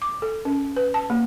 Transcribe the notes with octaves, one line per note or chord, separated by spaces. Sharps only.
D6
A4
C#4
B4
A5
A#3